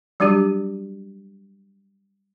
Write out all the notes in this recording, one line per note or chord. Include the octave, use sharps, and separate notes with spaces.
F#3 G3 D4 F#4 G4